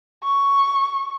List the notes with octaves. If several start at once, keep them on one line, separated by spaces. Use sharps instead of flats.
C#6